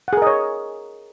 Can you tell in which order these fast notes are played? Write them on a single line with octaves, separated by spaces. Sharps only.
F#5 G#4 A#4 D#5 C#5